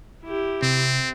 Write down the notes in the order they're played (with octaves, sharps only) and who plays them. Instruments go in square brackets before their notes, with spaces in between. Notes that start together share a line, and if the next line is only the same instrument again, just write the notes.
[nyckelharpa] E4 G4
[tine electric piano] C3 [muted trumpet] C4